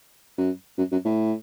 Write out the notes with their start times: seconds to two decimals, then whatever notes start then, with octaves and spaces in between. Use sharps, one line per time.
0.38 F#2
0.78 F#2
0.92 F#2
1.05 A2